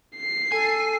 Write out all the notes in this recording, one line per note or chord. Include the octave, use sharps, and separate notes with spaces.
C7
A4 G#5